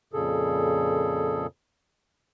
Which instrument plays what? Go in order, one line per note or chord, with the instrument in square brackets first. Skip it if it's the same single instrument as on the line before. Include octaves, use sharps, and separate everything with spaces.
[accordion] F2 A#2 C#3 G#4 A4